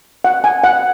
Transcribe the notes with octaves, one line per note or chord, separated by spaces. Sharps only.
F#5
G#5
F#5